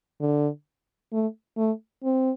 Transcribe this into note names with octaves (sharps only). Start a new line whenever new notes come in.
D3
A3
A3
C4